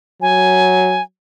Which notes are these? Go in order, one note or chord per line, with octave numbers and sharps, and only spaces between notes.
F#3 G#5